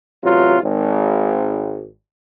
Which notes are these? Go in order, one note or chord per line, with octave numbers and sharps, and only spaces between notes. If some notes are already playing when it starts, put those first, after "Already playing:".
A1 C3 F#3 F4
G#1